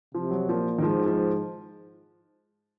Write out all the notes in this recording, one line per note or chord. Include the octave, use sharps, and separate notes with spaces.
C3 F3
F#3
A#2 F3
D#3
G#2 F3
F3